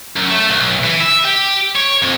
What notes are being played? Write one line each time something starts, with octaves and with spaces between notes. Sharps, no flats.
F#2
A3
B1
E3
E5
G4
C#5
F2